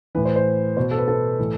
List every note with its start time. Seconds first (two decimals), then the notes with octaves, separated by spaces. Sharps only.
0.15 E3 B4
0.17 A2
0.25 C5
0.36 C5
0.77 B2 C5
0.91 A4
0.98 B4
1.08 A4
1.39 A2 E3